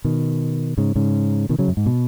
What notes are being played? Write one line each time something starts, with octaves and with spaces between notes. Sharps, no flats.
B2 D#3
G#2 C#3
G#2 C#3
B2 D#3
C#3 F#3
F#2
G#2
B2